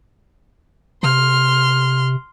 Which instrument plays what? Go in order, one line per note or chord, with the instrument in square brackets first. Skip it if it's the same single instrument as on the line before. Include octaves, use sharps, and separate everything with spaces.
[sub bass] C3 [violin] C6 F6